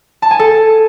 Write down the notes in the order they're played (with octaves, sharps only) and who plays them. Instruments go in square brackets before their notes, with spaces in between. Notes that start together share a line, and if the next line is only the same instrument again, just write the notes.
[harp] A5
G#5
A4